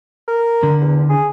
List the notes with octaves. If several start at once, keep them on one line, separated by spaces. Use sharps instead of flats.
A#4
D3
E2
G#4